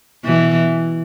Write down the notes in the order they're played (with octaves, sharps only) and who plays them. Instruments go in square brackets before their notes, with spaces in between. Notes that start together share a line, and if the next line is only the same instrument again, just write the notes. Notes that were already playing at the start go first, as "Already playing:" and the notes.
[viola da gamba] B2 E3